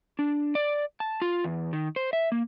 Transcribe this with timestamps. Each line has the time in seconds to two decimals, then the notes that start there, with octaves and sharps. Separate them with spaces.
0.19 D4
0.55 D5
1.00 A5
1.22 F4
1.44 E2
1.73 D#3
1.96 C5
2.13 E5
2.32 A#3